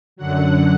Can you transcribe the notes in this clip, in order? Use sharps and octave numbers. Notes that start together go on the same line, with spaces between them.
F#2 D3 F#3 F#5